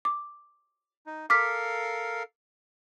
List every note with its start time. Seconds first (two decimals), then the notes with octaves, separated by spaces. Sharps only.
0.05 D6
1.06 D#4
1.30 A4 A#4 F5 D6 F6 B6